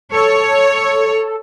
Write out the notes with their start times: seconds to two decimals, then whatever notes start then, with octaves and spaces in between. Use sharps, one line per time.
0.12 A4 C#5